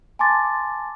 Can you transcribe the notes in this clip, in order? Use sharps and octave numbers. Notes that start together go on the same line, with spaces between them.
G#5 A5 C6 D6 A6